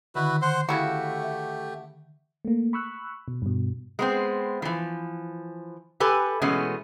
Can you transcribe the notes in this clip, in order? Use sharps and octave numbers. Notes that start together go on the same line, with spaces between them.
D3 D#3 E4 F#4 B4
C5 F#5 C6
C#3 A3 E4 F#4 G4
E5
A3 A#3
B5 C#6 E6 F#6
B2
G2 B2
G#3 B3 C4
E3 F3
G4 A4 B4 G#5
B2 E3 G#3 A3 B3 C#4